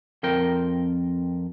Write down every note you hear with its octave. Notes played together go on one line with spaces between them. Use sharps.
F2 C4 A#4 G5